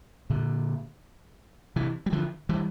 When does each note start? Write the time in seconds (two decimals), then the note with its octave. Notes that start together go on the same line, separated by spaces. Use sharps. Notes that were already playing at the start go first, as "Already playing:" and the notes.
0.30 A#2 D3
1.76 C3 E3
2.06 G3
2.12 D3 F3
2.49 E3 G3